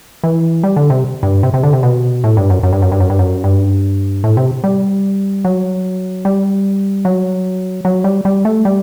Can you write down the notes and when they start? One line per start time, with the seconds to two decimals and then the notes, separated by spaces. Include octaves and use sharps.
0.24 E3
0.63 G3
0.76 D3
0.90 C3
1.23 G2
1.43 C3
1.54 C3
1.63 D3
1.73 C3
1.83 B2
2.24 A2
2.37 G2
2.50 F#2
2.63 F#2
2.73 G2
2.82 F#2
2.92 G2
3.00 F#2
3.10 G2
3.19 F#2
3.44 G2
4.24 A2
4.37 C3
4.64 G3
5.45 F#3
6.25 G3
7.05 F#3
7.85 F#3
8.04 G3
8.25 G3
8.45 A3
8.65 G3